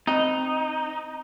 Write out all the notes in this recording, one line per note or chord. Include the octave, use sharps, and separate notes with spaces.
C4 D#4 D#5